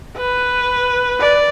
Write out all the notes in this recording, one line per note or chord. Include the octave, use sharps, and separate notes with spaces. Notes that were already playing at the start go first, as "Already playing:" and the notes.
B4
D5